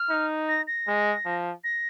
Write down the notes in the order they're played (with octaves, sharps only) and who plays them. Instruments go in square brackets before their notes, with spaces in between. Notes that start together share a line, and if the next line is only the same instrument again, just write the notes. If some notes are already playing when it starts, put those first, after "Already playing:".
Already playing: [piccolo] F6
[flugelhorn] D#4
[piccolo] A#6
A#6
[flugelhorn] G#3
F3
[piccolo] A#6